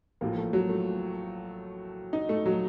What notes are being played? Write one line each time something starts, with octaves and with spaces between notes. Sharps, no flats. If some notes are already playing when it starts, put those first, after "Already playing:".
A1 A2 F3 A#3
A3
F#3
A3
D#4
A3
F#3